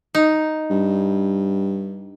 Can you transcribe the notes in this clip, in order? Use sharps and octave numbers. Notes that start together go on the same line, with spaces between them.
D#4
G2